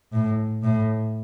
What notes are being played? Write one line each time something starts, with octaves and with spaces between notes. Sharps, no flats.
A2
A2